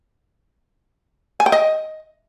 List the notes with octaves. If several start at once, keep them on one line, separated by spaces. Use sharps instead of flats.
G#5
G5
D#5